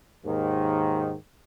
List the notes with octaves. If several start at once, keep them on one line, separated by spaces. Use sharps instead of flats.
D#2 G#2 D#3